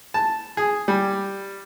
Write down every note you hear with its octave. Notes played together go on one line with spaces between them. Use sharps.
A5
G#4
G3